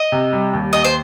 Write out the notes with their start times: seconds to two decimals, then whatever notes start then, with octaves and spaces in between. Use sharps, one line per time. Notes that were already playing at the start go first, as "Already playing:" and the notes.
Already playing: D#5
0.12 C3
0.33 G3
0.53 D#2
0.73 D#2 D#5
0.84 C5